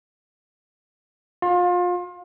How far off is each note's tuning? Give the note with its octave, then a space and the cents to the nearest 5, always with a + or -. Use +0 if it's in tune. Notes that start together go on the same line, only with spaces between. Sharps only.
F4 +30